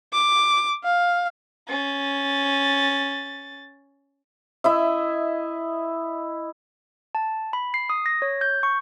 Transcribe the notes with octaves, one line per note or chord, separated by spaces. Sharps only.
D6
F5
C#4 A6
E4 D#5 E5
A5
B5
C7
D#6
A#6
C#5
G6
C#6